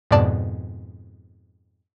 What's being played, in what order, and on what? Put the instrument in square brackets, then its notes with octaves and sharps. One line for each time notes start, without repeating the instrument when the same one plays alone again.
[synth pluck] F2 G#2 B2 D5 A5